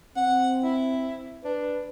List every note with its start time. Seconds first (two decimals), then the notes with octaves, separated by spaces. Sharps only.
0.17 C4 F#5
0.64 E4
1.44 D4 B4